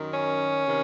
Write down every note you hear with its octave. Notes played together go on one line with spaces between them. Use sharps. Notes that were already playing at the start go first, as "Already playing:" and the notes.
Already playing: F#2 D#3
C#4
C3 D#3